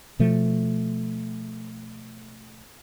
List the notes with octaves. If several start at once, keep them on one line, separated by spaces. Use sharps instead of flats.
B2 F3 A3